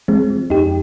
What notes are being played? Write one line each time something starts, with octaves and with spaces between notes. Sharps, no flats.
F3 G#3 C4
F3
F2 D#4 G4